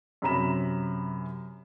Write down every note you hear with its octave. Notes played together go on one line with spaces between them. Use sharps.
F#2 C3 C#4 A#5 B5 E7